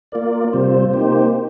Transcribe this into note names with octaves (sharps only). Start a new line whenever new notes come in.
A#3 F4 A#4 D5
C3 G3 C4 F4 C5
A#3 D#4 G4 C5